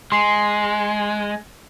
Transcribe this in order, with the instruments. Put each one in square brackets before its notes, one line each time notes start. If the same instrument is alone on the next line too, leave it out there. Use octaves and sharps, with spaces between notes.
[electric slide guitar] G#3 [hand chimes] C6 C7